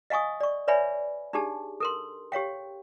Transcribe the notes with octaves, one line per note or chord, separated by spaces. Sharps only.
D#5 F5 G#5 C#6 D#6
D5 C#6
B4 C#5 D5 E5 G#5 B5
D4 D#4 G4 G#4 A5
A4 A#4 C6
G4 C#5 F5 G5